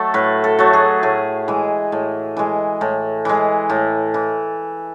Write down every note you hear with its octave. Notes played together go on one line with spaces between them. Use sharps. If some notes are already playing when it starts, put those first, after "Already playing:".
Already playing: F#3 A3 A4
A2 B4
A4
F#3 A3
G#4
A2 G#4
E3 G#3
A2
E3 G#3
A2
E3 G#3
A2
E3